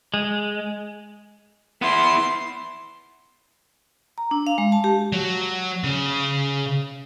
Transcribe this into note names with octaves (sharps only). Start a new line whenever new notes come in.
G#3
B3 E4 C6
A#5
D4
F5
G#3
A5
G4
F#3
C#3